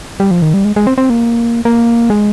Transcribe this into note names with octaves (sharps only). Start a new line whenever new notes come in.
G3
F3
D#3
G3
G#3
G#3
C4
C4
A#3
A#3
G#3